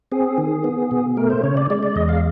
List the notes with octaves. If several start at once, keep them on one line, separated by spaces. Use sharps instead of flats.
C4 G#4
D#3
B3
B2
A3 A#4
C5
C#3 C#5
D5
G#3 D5
D5
E2 D#5
F5